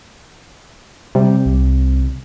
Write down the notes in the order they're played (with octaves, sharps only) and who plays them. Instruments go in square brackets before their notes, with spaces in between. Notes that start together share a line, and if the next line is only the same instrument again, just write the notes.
[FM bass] C3 [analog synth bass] G3
[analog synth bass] C2